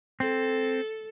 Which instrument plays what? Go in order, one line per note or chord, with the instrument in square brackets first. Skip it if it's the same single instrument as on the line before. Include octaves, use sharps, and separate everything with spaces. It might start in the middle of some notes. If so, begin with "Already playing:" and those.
[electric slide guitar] C4 [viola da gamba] A4